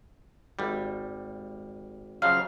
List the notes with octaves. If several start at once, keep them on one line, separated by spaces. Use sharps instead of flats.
G#1 G3
C#3 F3 F#3 F5